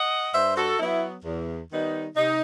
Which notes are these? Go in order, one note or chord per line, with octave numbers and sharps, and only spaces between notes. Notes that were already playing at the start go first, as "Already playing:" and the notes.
Already playing: D#5 F#5
G2 C5 E5
F#4 A4
F#3 B3 E4
E2
D#3 G3 B3 D#4
C3 D#4